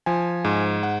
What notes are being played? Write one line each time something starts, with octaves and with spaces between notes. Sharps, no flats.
F3 G#5
G#2
F#5